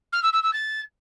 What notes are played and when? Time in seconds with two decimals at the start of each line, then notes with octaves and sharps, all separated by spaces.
0.12 F6
0.22 E6
0.33 E6
0.43 E6
0.53 A6